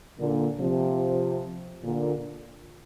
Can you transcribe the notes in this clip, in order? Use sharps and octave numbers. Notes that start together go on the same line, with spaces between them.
A#2 D3
C3 F3
A#2 D3